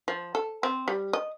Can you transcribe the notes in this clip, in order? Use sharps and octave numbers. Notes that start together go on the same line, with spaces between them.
F3
A4
C4
G3
D#5